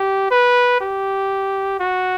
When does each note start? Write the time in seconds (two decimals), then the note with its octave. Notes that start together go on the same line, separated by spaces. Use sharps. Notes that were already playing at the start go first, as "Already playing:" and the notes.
Already playing: G4
0.31 B4
0.81 G4
1.80 F#4